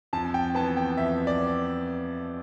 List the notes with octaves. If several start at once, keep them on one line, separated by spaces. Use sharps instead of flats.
F2 A5
G5
E3 B3 A5
G5
F2 E5
D5